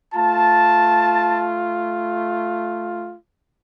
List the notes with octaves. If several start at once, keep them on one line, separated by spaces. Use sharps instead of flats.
A3 F4 A5